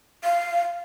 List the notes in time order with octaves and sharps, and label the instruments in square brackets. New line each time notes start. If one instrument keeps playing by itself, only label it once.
[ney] F5